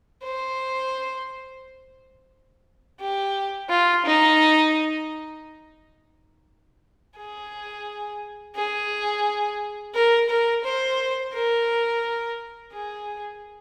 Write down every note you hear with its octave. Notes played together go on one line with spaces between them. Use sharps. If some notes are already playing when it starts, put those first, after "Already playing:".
C5
G4
F4
D#4
G#4
G#4
A#4
A#4
C5
A#4
G#4